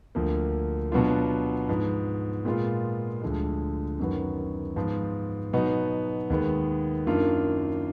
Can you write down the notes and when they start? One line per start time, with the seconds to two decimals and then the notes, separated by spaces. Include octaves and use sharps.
0.15 D2 D3 F3 A#3
0.92 B2 F#3 B3 D4 F4
1.68 G#2 F3 B3
2.45 A#2 G#3 B3 F4
3.22 D2 D3 F3 G#3
3.99 F#2 D#3 F#3 B3
4.76 G#2 F3 B3 F4
5.53 B2 F#3 B3 D#4
6.30 D#2 D#3 G#3 B3
7.07 F#2 D#3 A#3 D4 F4